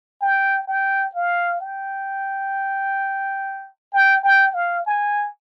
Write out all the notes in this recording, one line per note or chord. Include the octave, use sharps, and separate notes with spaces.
G5
G5
F5
G5
G5
G5
F5
G#5